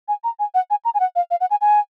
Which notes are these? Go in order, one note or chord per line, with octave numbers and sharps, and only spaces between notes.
G#5
A#5
G#5
F#5
G#5
A#5
G#5
F#5
F5
F5
F#5
G#5
G#5